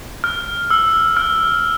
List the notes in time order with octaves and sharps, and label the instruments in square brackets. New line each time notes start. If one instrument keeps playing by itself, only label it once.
[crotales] F6
E6
F6